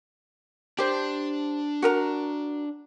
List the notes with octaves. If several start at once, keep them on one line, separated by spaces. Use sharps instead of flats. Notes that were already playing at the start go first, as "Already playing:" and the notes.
D4 G4 C5
F#4 A#4 A#5